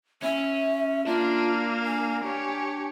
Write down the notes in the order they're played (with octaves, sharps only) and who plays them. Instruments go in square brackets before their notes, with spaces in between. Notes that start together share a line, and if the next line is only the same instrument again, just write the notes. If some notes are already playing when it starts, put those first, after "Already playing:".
[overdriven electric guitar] C#4 [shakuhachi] E5
[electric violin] A#3 F5 [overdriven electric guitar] D4 [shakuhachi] F4
[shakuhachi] G#5
[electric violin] G4 C#5